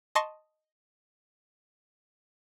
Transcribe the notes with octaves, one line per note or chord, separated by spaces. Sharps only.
D#5 A5 C6 C#6 A#6